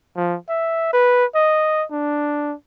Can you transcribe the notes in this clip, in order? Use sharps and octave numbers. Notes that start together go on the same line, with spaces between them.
F3
E5
B4
D#5
D4